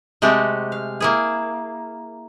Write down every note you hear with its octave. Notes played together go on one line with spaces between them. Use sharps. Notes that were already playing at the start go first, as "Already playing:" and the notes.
C3 G#3 A3 F#4 G4
F5
A#3 E4 G#4